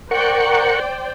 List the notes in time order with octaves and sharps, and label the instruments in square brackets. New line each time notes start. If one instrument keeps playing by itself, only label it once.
[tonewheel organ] A#4 F#5 C#6 [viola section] C5 D5 G5